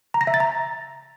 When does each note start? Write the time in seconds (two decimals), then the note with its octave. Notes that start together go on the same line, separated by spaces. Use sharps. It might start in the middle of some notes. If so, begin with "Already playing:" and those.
0.14 A#5
0.21 A#6
0.27 E5
0.34 A6
0.40 A#5